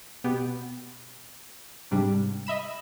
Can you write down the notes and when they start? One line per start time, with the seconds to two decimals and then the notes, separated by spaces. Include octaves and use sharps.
0.24 B2 B3 G4
1.91 G#2 C3 G3 D4
2.47 D#5 E5 B5 E7